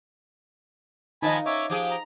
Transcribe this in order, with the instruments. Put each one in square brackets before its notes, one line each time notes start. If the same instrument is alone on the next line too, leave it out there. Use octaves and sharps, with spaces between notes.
[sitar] D#3 F3 [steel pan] D#4 D#5 [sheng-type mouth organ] G#5 A5 B5
[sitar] C#4 [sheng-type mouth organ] C#5 E5 D6
[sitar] F3 G4 G#4 [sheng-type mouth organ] D6
[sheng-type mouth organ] A#5